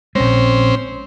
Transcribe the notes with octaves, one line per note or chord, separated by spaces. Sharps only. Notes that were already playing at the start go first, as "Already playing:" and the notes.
A#1 G#3 C4 C#4 C5